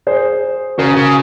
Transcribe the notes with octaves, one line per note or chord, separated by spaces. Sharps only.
G#4 C5
C#3 F#4 A#4
C#3